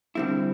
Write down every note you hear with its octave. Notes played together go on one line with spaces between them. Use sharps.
D3 G3 C4 E4